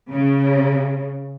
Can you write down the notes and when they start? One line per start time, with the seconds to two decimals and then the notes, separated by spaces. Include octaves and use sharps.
0.12 C#3